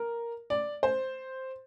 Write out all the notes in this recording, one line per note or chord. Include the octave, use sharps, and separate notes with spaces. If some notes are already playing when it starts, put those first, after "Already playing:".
Already playing: A#4
D5
C5